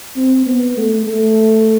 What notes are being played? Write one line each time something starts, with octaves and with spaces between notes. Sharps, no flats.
C4
B3
A3
A3